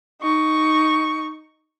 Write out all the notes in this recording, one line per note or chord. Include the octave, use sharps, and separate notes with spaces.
D#4 C#6